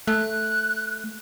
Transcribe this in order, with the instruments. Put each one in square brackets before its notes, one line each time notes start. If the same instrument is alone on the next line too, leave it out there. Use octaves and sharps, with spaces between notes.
[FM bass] A3 [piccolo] F#6